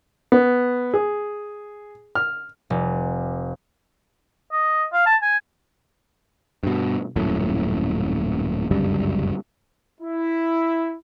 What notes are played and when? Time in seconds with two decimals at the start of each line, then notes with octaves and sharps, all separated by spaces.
0.32 B3
0.94 G#4
2.15 F6
2.70 F1
4.52 D#5
4.93 F5
5.06 A5
5.22 G#5
6.63 G2 B2
7.16 D#1 F#2 A2
8.71 G1 C#2 F#2 G3
10.01 E4